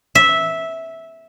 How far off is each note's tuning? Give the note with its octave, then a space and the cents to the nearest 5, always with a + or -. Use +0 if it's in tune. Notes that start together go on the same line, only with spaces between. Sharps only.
E5 -10